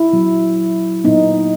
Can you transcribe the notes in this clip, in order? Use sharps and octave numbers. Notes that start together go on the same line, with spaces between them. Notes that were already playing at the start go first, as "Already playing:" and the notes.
Already playing: E4
A#2 F#3 B3
A#2 F#3 B3 D#4